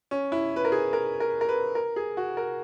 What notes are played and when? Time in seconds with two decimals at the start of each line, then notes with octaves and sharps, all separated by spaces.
0.11 C#4
0.32 E4
0.56 B4
0.65 A#4
0.72 G#4
0.93 A#4
1.20 A#4
1.41 A#4
1.49 B4
1.75 A#4
1.96 G#4
2.17 F#4
2.37 A#4